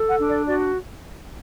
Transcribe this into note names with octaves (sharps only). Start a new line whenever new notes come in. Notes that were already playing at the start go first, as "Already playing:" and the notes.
Already playing: A4
F#5
D4
D5
F#4 D5